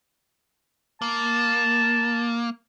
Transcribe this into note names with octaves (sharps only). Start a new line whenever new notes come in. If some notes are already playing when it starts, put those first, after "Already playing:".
A#3 A5